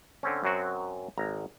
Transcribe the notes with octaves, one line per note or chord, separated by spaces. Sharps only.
D3 C4 C#4
F#2 F#3 C4 F#4
G#1 A#5